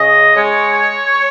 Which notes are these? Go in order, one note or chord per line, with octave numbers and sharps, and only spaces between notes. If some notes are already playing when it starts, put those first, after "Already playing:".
Already playing: C#3 D#5
G#3 C#5